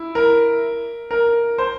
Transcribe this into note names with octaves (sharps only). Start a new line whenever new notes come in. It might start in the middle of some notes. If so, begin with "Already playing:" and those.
Already playing: E4
A#4
A#4
C5